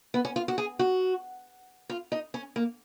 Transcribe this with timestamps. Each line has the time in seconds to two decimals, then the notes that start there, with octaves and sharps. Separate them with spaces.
0.14 B3
0.25 C#4
0.36 F4
0.48 F#4
0.58 G#4
0.79 F#4
1.89 F4
2.12 D#4
2.34 C#4
2.56 A#3